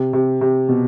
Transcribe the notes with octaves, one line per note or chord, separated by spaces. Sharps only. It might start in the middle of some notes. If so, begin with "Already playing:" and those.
Already playing: C3
C3
C3
B2